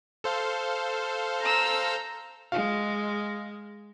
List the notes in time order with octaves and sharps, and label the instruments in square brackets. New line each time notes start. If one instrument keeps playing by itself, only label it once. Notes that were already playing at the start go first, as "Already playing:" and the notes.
[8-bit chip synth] A4 C5 F5
[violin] A#5 E6
[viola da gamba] G#3 [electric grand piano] F5